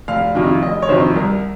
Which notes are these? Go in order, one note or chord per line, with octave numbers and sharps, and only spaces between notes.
F1 F5
F2 C3 D#3
F1 D#5
C#5
F2 C3 D#3 C5
C2 A#4